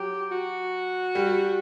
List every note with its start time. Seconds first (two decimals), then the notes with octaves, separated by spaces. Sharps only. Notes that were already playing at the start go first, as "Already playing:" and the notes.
Already playing: F#3 G4
0.32 F#4
1.15 G3 G4